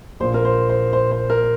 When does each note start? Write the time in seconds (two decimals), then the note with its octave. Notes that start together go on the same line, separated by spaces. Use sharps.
0.20 A#1 C5
0.23 A#2
0.34 A#4
0.45 C5
0.69 C5
0.93 C5
1.11 C5
1.30 A#4